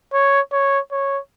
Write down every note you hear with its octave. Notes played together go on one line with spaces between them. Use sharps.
C#5
C#5
C#5